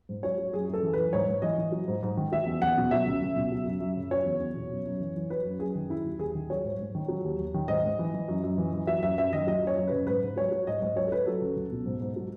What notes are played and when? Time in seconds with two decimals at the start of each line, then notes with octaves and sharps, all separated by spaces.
0.09 G#2
0.23 F#3 C#5
0.38 F#3
0.53 F#2 G#4
0.68 F#2
0.73 A4
0.83 E3
0.93 E3 B4
1.13 G#2 C#5
1.27 G#2
1.42 E3 D#5
1.58 E3
1.72 F#3
1.88 G#2
2.03 G#2
2.17 D#3
2.32 F#3 E5
2.46 E2
2.62 E2 F#5
2.77 B2
2.91 F#3 E5
3.07 C#2
3.22 C#2
3.36 B2
3.52 F#3
3.66 F#2
3.80 F#2
3.97 C#3
4.11 F#3 C#5
4.26 E2
4.40 E2
4.55 B2
4.71 F#2
4.86 F#2
5.00 E3
5.16 E3
5.30 F#3 B4
5.45 F#2
5.59 F#2 G#4
5.75 D#3
5.89 F#3 E4
6.05 D#2
6.19 D#2 G#4
6.35 D#3
6.50 F#3 C#5
6.64 G#2
6.79 G#2
6.95 D#3
7.08 F#3
7.25 D#2
7.39 D#2
7.54 D#3
7.68 G#2 D#5
7.84 G#2
7.99 E3
8.14 E3
8.28 F#2
8.44 F#2
8.58 E3
8.73 E3
8.87 F#3 E5
9.02 F#2 E5
9.18 F#2 E5
9.33 D#3 D#5
9.47 F#3 D#5
9.63 F#2 C#5
9.77 F#2
9.87 C#3 B4
10.07 G#2 B4
10.23 G#2
10.36 F#3 C#5
10.51 F#3
10.67 G#2 D#5
10.82 G#2 D#5
10.96 F#3 C#5
11.07 A4
11.12 F#3 B4
11.26 F#3 A4
11.42 C#2
11.56 C#2
11.72 B2
11.86 G#2
12.01 G#2
12.16 F#3